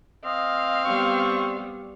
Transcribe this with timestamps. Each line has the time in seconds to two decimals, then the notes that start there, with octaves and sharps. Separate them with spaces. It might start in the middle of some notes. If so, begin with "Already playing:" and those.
0.25 C4 D#5 F5
0.85 G3 B3 C#6